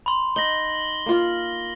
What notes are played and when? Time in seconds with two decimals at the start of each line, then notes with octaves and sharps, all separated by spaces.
0.06 B5 C6
0.36 D#4 A#6 F#7 G7
1.06 A#3 F4